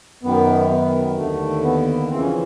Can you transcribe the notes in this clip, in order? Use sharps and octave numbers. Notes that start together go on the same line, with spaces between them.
F#2 D#3 B3
B3
D#2 D3 A3
B3
F2 C#3 E3 C4
C#4